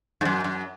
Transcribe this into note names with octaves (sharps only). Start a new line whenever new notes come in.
G#2
F#2
F#2